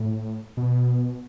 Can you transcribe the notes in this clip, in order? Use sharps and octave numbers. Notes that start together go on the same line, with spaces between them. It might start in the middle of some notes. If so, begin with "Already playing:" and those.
Already playing: A2
B2